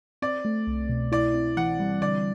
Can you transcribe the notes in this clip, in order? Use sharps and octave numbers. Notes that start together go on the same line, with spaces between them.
C4 D5
A3
C2
B2
E4 D5
C4
E3 F#5
G3
D3 D5